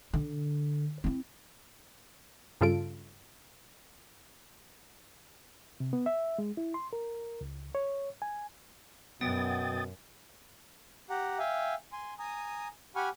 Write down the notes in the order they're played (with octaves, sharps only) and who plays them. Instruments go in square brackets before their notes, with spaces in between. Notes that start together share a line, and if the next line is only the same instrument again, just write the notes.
[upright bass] D3
C4 E4
[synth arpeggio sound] G2 C#3 F4 A4 D7
[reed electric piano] C3
B3
E5
G#3
E4
C6
A#4
C#2
C#5
G#5
[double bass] F#2 [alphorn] B2 [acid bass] B3 [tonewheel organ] G5 D#6 A6
[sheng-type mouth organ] G4 F#5 A#5
E5 F5 G5 G#5
G#5 C6
G#5 A#5 D#6
G4 F#5 G#5 B5 C#6 F6